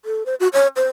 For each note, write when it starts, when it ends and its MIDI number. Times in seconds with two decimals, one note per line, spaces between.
0.05 0.26 69
0.26 0.35 72
0.40 0.48 66
0.53 0.67 73
0.76 0.87 72